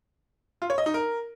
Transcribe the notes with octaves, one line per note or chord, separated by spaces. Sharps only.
F4
C#5
D#5
D#4
A#4